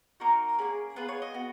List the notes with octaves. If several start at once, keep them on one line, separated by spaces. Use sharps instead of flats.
A#3 D#4 F#4 A#4
A#3 C#4 G#4
B3 F4 G#4 B4
C#5
D#5
B3 F#4